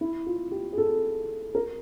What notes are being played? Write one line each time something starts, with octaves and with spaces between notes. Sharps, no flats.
E4
F4
G4
G#4
A4
A#4